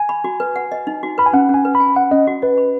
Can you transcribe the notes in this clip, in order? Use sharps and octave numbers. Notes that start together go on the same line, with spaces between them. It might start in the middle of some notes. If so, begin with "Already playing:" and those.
Already playing: G#5
B5
F#4
B4
F#5
D#5
D#4
F#4
B4 B5
G#5
C#4 F#5
C#4
G#5
B4
B5
G#5
F#5 G#5
C#4 D#5
F#4
B4 D#5
B5